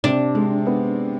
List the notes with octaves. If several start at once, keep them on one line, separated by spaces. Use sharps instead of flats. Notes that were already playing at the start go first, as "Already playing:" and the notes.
C3 D4
G#3
B3